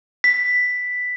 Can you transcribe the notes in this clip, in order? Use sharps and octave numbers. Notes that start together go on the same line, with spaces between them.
B6